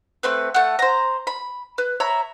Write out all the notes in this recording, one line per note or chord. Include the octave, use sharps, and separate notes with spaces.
A3 C4 B4
A3 F#5
C5 A#5
B5
B4
C#5 E5 A#5 B5